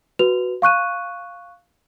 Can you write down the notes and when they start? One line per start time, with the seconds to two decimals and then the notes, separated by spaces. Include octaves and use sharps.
0.19 F#4 B4 F7
0.62 F5 C#6 F#6 D#7